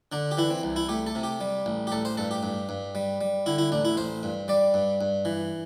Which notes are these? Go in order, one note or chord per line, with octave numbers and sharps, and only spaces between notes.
D3 D4
G4
E3 E4
C4
C2
E4
A3 G4
A4
C3
G4
G3
A1
G4
A1 A4
C5
G2 A4
G4
G2
G2
G3
G3
D3 E4
E4
A1 D4
E4
A1 C5
G2
G3 D5
G2
G2
E3